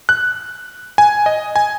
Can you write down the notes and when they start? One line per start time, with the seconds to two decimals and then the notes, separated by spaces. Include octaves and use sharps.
0.09 F#6
0.98 G#5
1.26 D#5
1.56 G#5